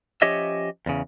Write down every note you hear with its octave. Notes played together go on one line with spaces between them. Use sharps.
F3 C#4 G4 C#5 D#5 E5
E2 C#3